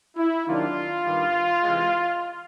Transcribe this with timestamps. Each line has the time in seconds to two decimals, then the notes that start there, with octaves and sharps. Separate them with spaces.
0.17 E4
0.45 C3 D#3 F#3 A#3 D4 F4
1.05 G2 D#3 G3
1.63 C3 E3 G#3